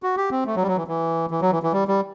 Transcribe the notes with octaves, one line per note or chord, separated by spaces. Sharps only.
F#4
G4
C4
A3
F#3
G3
F#3
E3
E3
E3
F#3
E3
E3
G3
G3